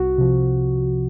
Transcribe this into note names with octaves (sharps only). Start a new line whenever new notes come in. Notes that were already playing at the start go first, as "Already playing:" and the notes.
Already playing: C2 F#4
C3 F3